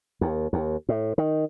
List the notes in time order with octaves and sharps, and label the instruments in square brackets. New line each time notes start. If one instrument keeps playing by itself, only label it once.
[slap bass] D#2
D#2
A2
D#3